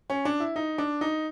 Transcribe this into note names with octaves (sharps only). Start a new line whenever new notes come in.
C#4
D4
E4
D#4
D4
D#4